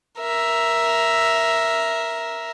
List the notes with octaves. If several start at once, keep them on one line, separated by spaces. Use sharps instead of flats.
A#4 E5